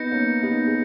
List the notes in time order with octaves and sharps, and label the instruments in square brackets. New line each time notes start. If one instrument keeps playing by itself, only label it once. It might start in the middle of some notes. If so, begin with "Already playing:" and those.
Already playing: [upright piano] B3 D#4 [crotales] G6 A#6 C#7
[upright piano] A#3 C#4
B3 D#4
G#4